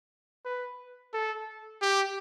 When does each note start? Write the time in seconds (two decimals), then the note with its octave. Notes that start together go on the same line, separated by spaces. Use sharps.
0.45 B4
1.14 A4
1.82 G4